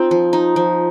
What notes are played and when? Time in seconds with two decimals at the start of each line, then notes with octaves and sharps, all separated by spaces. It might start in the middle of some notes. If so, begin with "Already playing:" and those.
Already playing: C4 D#4 F4
0.11 F3
0.33 D#4
0.56 F3